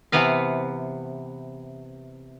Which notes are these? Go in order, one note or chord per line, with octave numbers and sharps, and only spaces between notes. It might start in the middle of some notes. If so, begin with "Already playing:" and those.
C3 E3 B3 B4 F5